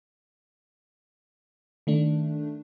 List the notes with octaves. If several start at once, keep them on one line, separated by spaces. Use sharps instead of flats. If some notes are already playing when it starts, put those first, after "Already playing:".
D#3 A3 D4